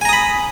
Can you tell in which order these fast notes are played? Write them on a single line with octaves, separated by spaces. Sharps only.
G#5 A#5 D#6 B5